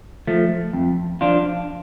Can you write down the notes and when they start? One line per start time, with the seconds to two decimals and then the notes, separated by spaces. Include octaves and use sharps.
0.27 F3 A3
0.73 F2
1.21 F3 D4 F4